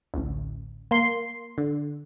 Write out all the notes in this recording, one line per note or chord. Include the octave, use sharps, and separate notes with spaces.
A1 D2
A#3 C6
D3